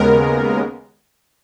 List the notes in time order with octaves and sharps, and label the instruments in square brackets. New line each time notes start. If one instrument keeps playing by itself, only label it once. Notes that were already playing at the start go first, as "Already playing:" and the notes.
Already playing: [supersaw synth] D#2 C#3 G#3 B3 A#4